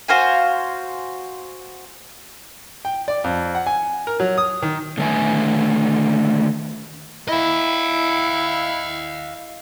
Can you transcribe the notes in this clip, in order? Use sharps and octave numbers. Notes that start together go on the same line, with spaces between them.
F#4 C5 F5 G#5
G5
D5
F2
F#5
G#5
A#4
F#3
D#6
D#3
D3 D#3 A3 B4 E5 G#5
E4 D#5 F5